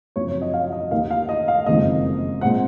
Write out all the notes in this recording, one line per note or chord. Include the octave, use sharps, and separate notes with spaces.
F#2 C#3 F3 C4 C#5
C#5
D#5
F5
D#5
D#2 D#3 A#3 F5
F5
D#5
F5
F#1 F2 D#3 G#3 D#5
A#2 G#3 C4 F#5